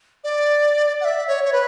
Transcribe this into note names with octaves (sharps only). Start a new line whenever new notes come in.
D5
F#5
E5
C#5
C#5
B4